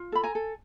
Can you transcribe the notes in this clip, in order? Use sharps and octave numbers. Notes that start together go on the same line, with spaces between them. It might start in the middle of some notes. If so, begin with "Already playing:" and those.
Already playing: F4
A4 B5
G#5 A#5
A4